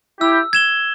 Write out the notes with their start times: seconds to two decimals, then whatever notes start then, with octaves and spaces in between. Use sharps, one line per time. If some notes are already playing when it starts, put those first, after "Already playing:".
0.20 E4 G4 E6
0.53 G#6 E7 G7